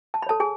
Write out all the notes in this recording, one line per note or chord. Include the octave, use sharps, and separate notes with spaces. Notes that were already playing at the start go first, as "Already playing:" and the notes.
A5
B5
A4 C#5 A5
G#4 G#5